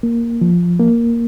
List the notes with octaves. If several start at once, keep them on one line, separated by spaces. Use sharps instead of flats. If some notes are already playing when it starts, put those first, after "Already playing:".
A#3
F3
A#3